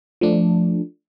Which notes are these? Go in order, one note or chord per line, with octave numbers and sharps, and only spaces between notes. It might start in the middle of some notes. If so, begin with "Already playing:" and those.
F3 A3 D4